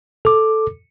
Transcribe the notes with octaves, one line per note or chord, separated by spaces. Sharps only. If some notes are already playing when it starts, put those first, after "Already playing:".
A4 D6